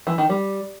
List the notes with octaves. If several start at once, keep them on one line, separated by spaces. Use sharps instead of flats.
E3
D#3
G3